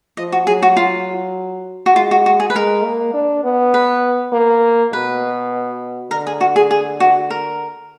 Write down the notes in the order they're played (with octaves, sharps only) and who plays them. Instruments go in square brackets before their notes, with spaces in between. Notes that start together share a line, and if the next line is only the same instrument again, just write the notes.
[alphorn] F3 [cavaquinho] D#5
[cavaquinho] F#4
[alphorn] F#3 [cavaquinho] G#4
[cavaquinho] F#4
F4
F#4
[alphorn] G#3 [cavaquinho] F4
[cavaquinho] F#4
F#4
G#4
B4
[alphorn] G#3 [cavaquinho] A#4
[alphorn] A#3
D4
B3
[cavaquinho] B4
[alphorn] A#3
[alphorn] B2 [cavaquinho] B4
[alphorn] D3 [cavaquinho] A#4
[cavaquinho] G#4
F#4
G#4
G#4
F#4
A#4